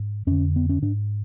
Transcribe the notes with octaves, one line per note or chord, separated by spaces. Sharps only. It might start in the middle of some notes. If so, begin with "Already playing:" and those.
Already playing: G#2
F2 D3 C#4
B3
C#4
G#2 D4